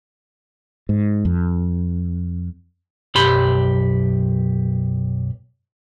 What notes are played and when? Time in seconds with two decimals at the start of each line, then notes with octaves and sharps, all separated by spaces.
0.89 G#2
1.25 F2
3.15 B1 F#2 G4 B5 C6